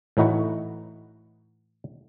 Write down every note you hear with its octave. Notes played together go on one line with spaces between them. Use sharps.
A2 E3 D#4 F#4 B4 F#5